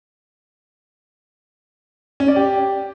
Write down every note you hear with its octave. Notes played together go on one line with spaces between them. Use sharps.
C#4
D5
G4